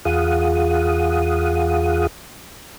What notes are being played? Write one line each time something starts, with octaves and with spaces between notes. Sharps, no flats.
E2 F4 G#4 F5 F#5 D#6